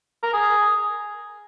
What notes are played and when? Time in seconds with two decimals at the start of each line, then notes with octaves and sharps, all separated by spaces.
0.23 A#4
0.33 G#4